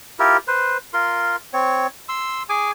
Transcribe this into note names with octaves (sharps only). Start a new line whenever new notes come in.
E4 F4 G4 A#4
B4 C5
F4 A#4 C6
C4 C#5
C6 E6
G#4 G#5 D6